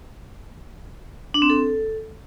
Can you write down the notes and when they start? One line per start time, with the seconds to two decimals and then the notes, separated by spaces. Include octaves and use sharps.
1.34 D4
1.42 C4
1.50 A4